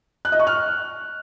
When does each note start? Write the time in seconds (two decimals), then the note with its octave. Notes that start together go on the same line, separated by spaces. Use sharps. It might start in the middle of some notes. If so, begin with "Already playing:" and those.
0.25 F#6
0.32 D#5
0.39 C#6
0.47 F6